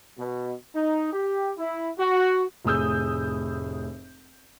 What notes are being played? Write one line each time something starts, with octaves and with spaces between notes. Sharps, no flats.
B2
D#4
G4
E4
F#4
F1 A2 G#4 D#6 E6 G6